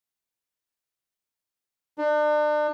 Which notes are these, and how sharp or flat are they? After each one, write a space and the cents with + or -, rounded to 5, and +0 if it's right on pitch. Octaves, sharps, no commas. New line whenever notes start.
D4 +35